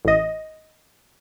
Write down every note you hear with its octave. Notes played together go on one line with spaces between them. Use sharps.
A1 D#5